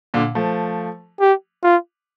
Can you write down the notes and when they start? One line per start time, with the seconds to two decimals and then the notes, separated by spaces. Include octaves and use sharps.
0.14 A#2 D3
0.35 F3 A3
1.20 G4
1.64 F4